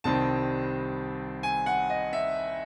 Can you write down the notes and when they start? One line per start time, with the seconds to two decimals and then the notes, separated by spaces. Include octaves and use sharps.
0.04 C2 C3 D#3 G3 C4 A5
1.43 G#5
1.66 F#5
1.90 D#5
2.13 E5